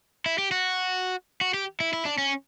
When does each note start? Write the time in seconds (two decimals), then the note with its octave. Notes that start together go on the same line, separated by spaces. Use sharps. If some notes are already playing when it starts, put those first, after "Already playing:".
0.26 E4
0.38 G4
0.51 F#4
1.41 F#4
1.54 G4
1.80 E4
1.93 E4
2.05 D4
2.18 C#4